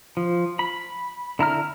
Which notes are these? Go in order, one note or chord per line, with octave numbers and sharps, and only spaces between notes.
F3
B5
D3 E4 A#5 F6